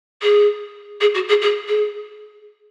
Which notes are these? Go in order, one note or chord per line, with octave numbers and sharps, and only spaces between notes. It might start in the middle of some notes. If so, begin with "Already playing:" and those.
G#4
G#4
F#4
G#4
G#4
G#4